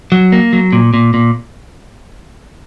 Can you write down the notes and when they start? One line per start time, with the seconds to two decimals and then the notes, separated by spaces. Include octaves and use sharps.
0.12 F#3
0.32 A#3
0.53 F#3
0.73 A#2
0.94 A#2
1.14 A#2